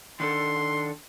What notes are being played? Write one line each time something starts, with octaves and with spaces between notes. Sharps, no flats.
D#3 D4 A4 C6